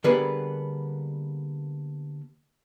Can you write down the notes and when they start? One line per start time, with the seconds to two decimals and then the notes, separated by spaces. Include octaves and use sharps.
0.04 D3 G3 A#3 B3 G#4 B4